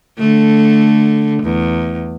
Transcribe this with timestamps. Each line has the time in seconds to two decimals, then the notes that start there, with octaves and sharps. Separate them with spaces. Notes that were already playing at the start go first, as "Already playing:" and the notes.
0.18 D3 A3
1.43 E2